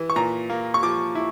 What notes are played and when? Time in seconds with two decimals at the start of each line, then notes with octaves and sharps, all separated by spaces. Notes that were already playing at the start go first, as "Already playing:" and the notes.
Already playing: E3
0.10 C#6
0.16 A#2 A#5
0.50 A#3
0.74 C#6
0.83 F3 D6
1.15 E4